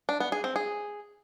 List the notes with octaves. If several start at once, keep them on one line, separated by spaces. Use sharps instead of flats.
D4
B3
G#4
C4
G#4